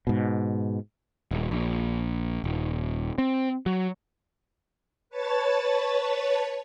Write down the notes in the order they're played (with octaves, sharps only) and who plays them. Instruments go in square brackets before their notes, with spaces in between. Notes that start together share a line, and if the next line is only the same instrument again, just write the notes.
[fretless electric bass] G#2 B2
[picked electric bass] D#1
A#1
D#1
C4
F#3
[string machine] B4 C#5 A5 A6